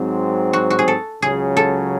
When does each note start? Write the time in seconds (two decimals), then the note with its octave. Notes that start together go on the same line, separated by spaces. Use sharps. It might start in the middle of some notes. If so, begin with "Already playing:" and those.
Already playing: G#2 F#3 C4
0.53 F#4
0.70 F#4
0.79 G#4
0.88 A4
1.22 C#2 C#3 F#3 G#4
1.57 A4